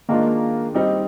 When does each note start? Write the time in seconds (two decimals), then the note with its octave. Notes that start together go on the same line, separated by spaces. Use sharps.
0.09 D#3 G#3 A#3 D4 F4
0.74 G3 C4 D#4